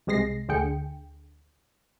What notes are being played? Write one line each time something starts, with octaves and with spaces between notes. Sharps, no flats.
C2 C3 G#3 A#6 C7
D2 D3 G#4 G5 C#7